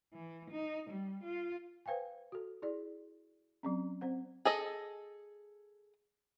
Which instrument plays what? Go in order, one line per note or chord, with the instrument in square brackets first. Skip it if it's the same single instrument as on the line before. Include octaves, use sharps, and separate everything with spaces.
[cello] E3
D#4
G3
F4
[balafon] B4 C5 F5 G5 G#5
F#4 A4
E4 G#4 D5
F#3 C4 C#4
C4 C5 F#5
[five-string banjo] G#4 A4 D#5